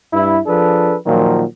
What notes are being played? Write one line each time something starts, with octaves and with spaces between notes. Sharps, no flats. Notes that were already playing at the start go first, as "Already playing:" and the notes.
G2 E4
F3 D4 G#4 A4 B4
A#2 D#3 F3 F#3